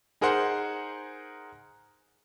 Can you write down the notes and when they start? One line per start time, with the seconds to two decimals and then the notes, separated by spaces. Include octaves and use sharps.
0.21 D#4 G#4 A#4 C5 F#5 C6